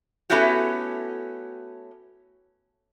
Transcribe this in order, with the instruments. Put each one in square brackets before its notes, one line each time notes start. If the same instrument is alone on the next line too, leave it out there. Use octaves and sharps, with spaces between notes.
[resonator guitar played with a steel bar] A3 B3 C#4 E4 F#4 G4